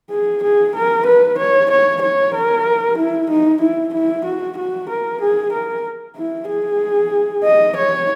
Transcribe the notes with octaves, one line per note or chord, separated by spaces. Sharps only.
G#4
G#4
A#4
B4
C#5
C#5
C#5
A#4
E4
D#4
E4
E4
F#4
F#4
A#4
G#4
A#4
E4
G#4
D#5
C#5